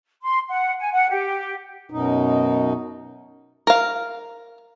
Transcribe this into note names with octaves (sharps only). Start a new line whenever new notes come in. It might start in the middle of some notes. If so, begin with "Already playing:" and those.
C6
F#5
G#5
F#5
G4
F#2 B2 D#4
A#4 F5